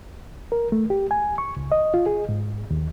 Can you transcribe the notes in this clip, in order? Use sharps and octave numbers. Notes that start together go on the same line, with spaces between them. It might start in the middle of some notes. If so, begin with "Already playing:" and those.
A#4
A3
G4
G#5
C#6
C#2
D#5
F4
G#4
G#2
D#2